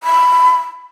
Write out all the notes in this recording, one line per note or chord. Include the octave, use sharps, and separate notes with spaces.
B5